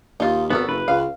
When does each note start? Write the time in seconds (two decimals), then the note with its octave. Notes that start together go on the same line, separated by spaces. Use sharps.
0.20 D#2 D#4 F4
0.50 G#1 B3 F#4 A4 A#4
0.69 F#1 B4
0.88 C#2 F5